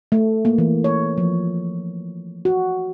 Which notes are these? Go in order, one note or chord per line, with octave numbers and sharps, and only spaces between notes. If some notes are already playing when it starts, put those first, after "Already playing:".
A3
A#3
E3
C#5
F3
F#4